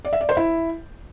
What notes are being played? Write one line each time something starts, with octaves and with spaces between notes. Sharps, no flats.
D5
E5
D5
C5
E4